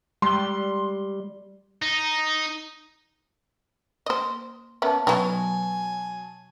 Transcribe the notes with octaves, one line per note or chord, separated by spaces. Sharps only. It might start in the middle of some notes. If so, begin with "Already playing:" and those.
G3 G#3 C6 G7
D#4
A#3 C5 D#5 C6 D#6
A#3 B3 C#4 E5 A5
B2 F#3 B3 C#4 D#4 G#5 A5